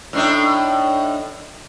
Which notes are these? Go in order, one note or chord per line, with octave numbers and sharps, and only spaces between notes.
A2 D4 D#4